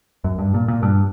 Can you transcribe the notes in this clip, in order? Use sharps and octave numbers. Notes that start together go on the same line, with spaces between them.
F#2
G2
A#2
A#2
G2